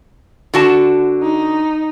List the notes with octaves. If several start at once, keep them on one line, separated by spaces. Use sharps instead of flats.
D3 F#4 A5
D#4